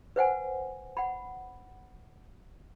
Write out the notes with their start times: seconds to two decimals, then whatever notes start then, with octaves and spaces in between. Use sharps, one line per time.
0.16 B4 C5 F#5 G#5
0.97 F#5 B5